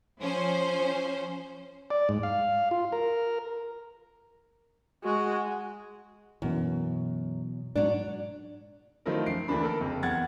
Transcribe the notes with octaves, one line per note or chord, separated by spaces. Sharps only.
F3 C#4 C5
D5
G#2
F5
F4
A#4
G#3 F#4
F#2 B2 E3
G#2 F#3 D4
D#3 F3 F#3 A3 E4 A#4
F#2 C7 D7
D2 E3 A#3 D4 B5
A4 A#4
F#1 F2
E2 F#5 G#6 A6